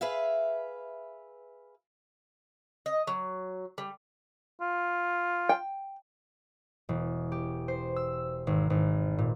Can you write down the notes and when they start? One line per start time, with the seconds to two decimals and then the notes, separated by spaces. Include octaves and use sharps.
0.01 G#4 B4 E5 F5
2.86 D#5
3.07 F#3
3.78 G3
4.61 F4
5.49 G5
6.89 E1
7.32 G4
7.68 C5
7.96 E6
8.47 G#1
8.70 G#1
9.18 A#2